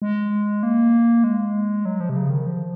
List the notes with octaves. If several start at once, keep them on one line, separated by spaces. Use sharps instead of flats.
G#3
A#3
G#3
F#3
F3
C3
C#3
D#3
F3